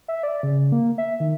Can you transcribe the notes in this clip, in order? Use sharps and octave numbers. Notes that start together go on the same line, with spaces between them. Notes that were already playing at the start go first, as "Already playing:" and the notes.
E5
D5
C#3
A#3
E5
D#3